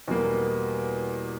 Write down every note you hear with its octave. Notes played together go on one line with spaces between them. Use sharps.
E2 B2 G3 A#3